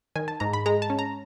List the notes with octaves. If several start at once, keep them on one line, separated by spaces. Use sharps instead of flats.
D#3 G#5
A5
G#2 A#5
B5
G#3 A#5
A5
C#4
A#5